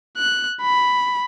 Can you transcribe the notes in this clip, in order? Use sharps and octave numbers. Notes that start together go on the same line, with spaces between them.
F#6
B5